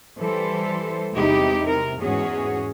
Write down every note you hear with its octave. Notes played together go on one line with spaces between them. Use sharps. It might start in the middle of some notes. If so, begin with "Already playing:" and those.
E3 G3 A4 C5
E2 C3 G#3 D#4 E4 G4
C3 A#4
E2 G#2 C#4 F#4 G#4